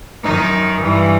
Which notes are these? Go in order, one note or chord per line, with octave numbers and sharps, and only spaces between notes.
F#2 D#3 D#4
G2 E3